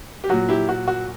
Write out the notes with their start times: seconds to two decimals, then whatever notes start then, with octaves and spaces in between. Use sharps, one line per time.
0.24 G4
0.29 A#2 F#3 F#4
0.49 E4 G4
0.69 F#4
0.88 F#4